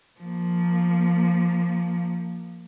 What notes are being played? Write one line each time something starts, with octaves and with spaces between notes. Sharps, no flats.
F3 A#3